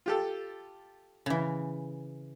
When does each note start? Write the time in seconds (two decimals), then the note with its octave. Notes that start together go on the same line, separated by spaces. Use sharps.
0.06 F4 G4 A4
1.26 C#3 E3